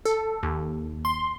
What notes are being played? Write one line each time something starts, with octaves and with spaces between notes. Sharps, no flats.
A4
D#2
C6